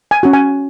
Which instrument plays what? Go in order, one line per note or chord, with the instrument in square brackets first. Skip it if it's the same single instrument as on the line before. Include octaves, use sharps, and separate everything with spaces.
[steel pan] G#5
C#4 F#4
G#5